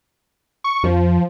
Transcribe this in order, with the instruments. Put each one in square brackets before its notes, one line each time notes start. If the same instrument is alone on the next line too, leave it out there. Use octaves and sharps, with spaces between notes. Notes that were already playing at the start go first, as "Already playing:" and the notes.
[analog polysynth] C#6
[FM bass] F2 [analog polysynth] F3